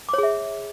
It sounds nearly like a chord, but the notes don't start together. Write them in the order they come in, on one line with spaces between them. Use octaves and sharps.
D6 C#5 G#4 E5